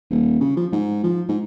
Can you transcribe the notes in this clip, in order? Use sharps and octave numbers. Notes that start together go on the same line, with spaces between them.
D#1
C#3
F3
G#2
F3
G#2